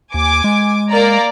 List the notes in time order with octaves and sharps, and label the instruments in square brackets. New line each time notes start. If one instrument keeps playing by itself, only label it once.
[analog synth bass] D#2 [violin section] G#5 D6
[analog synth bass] G#3
[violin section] A#3 D5 A#5